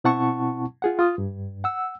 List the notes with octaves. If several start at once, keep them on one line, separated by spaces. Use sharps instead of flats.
B2 C4 E4 F#5 A5 C#6
F4 G#4 F#5
F4 D#6
G2
F#5 E6